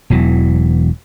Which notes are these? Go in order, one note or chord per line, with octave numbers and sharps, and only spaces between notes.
E1 E2 E3 F#3